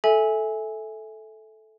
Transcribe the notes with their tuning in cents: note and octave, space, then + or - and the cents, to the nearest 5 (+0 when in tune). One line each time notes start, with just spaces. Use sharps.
A4 -10 E5 -10 G#5 +0